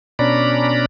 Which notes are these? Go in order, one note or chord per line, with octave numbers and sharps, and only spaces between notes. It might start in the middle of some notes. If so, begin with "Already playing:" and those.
B2 C#4 D4 D5 A#5 B5